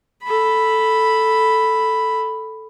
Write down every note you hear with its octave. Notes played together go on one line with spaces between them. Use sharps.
A4 B5